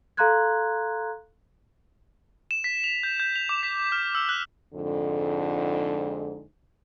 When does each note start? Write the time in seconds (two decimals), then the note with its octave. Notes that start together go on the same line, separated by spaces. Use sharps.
0.17 A4 F5 A#5 C6 F#6 G#6
2.51 E7
2.64 B6
2.84 F7
3.03 G6
3.20 G6
3.36 F7
3.49 D6
3.63 B6
3.92 F6
4.15 E6
4.29 F#6
4.74 F2 G#2 D3